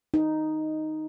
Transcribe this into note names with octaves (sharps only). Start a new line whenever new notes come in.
D#4